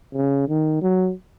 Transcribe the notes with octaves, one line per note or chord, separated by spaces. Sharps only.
C#3
D#3
F#3